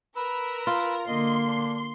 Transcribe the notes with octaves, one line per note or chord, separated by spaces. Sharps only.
A#4 B4 B5 E6
F4
D3 A#3 D#5 C6
D4